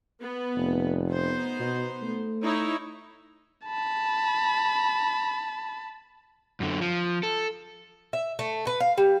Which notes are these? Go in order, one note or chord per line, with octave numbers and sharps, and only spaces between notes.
B3
F1
B3 D#4 C5
B2
A3
D#4 E4 C#5
A5 B5
F#2 D3
F3
A4
E5
A3
B4
F5
G3